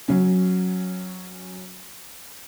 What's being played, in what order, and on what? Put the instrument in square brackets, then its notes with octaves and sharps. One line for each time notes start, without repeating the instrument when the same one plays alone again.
[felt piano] F#3 C#4